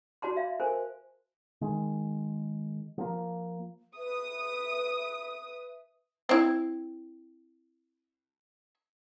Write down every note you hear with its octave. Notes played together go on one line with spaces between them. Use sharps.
F#4 D5 A5 C6
E5 F5
A#4 C5 G#5
D#3 G#3
F3 A#3
B4 E5 D#6
C4 E4